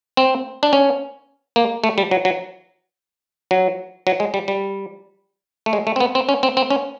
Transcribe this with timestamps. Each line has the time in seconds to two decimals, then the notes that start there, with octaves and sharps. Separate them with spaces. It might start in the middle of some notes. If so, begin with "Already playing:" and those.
0.17 C4
0.63 D4
0.73 C#4
1.56 A#3
1.84 A3
1.98 G3
2.11 F#3
2.25 F#3
3.51 F#3
4.07 F#3
4.20 G#3
4.34 G3
4.48 G3
5.66 A3
5.73 G#3
5.87 A3
5.96 C4
6.00 B3
6.15 C4
6.29 C#4
6.43 C4
6.57 C4
6.70 C#4